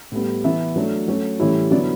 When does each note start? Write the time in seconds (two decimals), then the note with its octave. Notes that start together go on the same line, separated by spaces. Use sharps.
0.12 A2 G3 B3
0.44 E3 B3 E4 E5
0.76 F#3 A3 D4
1.08 F#3 A3 C#4
1.40 A2 E3 G3 C#4 E4
1.71 D3 F#3 B3 E4 D5